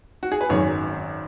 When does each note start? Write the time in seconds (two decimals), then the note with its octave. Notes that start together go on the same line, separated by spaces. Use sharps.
0.23 F#4
0.32 G#4
0.41 B4
0.49 G#1 F#2 D#3 G#4 C#5